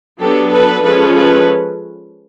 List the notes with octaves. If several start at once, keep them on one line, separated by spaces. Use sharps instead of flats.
F#3 B3 D4 G4 A4
A4 B4
F3 G#3 C#4 A4 B4
A4 B4